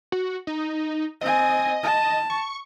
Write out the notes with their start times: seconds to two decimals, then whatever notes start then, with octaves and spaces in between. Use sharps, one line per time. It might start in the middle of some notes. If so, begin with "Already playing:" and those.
0.12 F#4
0.47 D#4
1.21 C4 D#5 G#5
1.83 A5
2.30 C#6